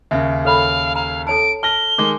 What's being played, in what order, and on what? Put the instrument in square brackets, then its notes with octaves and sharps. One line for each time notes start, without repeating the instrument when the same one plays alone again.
[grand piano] D#2 C#3 [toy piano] E5
[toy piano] A4 C#5 B5 [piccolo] F5
[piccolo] F5 [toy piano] A#5
[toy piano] A4 C#5 A5 [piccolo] D7
[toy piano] A5 [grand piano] F6 A#6 [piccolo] G7
[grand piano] D#3 G#3 [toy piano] D6